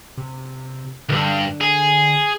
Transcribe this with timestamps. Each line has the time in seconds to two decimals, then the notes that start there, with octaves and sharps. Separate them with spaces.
0.17 C3
1.09 C2 G2 D3
1.61 G#4